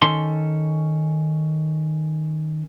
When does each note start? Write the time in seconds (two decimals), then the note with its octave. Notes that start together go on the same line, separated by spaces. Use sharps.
0.02 D#3 C#4 A4 C6